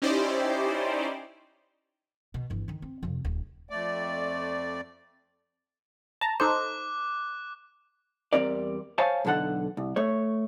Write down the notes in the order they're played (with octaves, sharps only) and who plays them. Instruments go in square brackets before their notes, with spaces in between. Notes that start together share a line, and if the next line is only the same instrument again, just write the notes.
[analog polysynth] C#4 D#4 E4 G4 C5 D5
[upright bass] B2
G1 E3
D3 D#3
C4
F2 C3
D1
[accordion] F2 A3 D5
[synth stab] A5 A#5
[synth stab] D#4 A4 C5 [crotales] D6 F#6
[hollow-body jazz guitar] E2 D#3 G3 C4 A#4 D5
C5 C#5 F5 G#5 A5
B1 E2 D3 A4 F#5
C2
A3 C#5